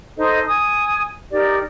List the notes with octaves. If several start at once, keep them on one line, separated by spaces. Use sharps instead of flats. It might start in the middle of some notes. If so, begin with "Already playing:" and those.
D#4 A4 C5 D#5
G#5 D#6
D#4 G4 A#4 D5